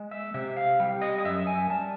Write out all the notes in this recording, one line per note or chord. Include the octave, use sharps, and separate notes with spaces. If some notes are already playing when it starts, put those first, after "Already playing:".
Already playing: G#3
E5
C3 E5
F5
G3
D#5
D#5
F#2 E5
G#5
G3 A5